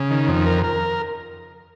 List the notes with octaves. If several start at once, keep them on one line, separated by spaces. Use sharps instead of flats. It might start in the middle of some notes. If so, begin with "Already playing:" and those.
Already playing: C#3
D#3
F2
A#4
A#4